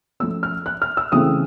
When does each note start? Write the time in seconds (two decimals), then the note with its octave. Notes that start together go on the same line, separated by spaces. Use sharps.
0.20 F3 A3 C#4 E6
0.43 F6
0.66 F#6
0.82 F6
0.97 E6
1.12 C#3 E3 A3 C4 D#6